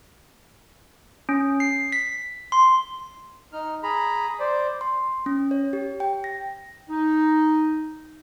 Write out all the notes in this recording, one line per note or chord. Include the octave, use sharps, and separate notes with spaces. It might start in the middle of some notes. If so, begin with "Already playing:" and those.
C#4
C7
B6
C6
D#4 F6
G#4 A#5 B5
C5 D5
C6
C#4
C#5
G4
G5
A#6
D#4